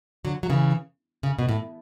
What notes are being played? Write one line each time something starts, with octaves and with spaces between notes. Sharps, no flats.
D3 F#3
F#3
C#3 E3
C#3
B2
A2